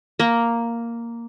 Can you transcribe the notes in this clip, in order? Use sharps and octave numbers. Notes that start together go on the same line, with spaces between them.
A#3